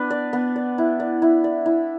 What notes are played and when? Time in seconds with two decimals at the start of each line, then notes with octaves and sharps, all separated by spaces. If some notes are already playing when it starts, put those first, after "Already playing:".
Already playing: B3 D4 B4
0.11 D5
0.33 B3
0.56 D5
0.78 E4
1.00 D5
1.22 E4
1.44 D5
1.66 E4